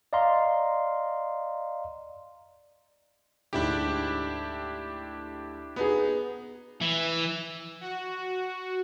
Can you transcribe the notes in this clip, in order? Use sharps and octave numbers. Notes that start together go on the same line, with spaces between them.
D5 D#5 F5 A#5 C6
D2 G#2 D4 E4 G4
B3 D#4 G#4 B4
E3
F#4